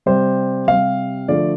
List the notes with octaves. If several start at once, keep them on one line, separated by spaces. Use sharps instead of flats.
C3 G3 C5
C3 G3 F5
D3 F3 A3 D5